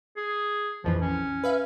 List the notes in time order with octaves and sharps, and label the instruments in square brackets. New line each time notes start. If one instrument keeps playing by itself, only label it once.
[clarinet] G#4
[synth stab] A#1 F2 E3 [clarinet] F3
[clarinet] C#4
[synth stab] B4 E5 F5